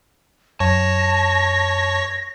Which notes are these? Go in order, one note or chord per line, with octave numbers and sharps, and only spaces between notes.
F#2 C#5 A5 A#6